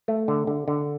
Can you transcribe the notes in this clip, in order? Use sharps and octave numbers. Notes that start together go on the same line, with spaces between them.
A3
D3
D3
D3